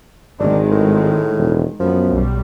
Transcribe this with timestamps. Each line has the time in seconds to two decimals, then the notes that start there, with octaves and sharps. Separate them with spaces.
0.40 G#1 D#3 G#3 D4
0.72 A2
1.37 E1
1.80 F#2 F3 B3
2.12 B1 G3